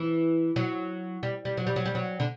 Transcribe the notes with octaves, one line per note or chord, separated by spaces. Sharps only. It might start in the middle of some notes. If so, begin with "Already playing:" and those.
Already playing: E3
F#3
G3
G3
F#3
G3
F#3
G3
F#3
D3